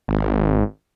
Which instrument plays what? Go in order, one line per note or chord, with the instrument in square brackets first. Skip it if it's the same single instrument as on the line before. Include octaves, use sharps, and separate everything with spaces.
[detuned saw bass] G#1